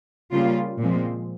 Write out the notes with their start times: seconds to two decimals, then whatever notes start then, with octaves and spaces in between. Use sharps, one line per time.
0.32 C#3 G3 A#3 F4
0.79 A#2 F3 G#3 C4